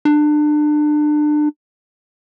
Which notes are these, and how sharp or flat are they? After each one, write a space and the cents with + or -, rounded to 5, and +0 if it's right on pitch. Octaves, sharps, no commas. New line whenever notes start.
D4 +30